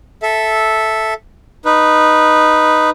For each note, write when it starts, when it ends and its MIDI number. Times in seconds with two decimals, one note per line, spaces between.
0.23 1.14 69
0.23 1.14 76
1.65 2.90 63
1.65 2.90 71